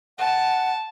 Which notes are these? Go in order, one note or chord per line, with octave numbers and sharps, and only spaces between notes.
F#5 A5